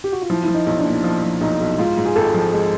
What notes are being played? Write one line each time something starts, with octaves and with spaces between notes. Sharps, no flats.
G4
F#4
F4
F3 E4
F3 E4
D#4
B1
D4
A#2
F3
F3
B1 D#4
B1
G#2 F4
G#2
G#4
G#1 A4
F3
G#3